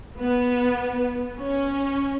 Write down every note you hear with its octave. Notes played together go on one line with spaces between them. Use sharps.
B3
C#4